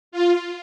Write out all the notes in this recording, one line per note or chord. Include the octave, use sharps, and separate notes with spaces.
F4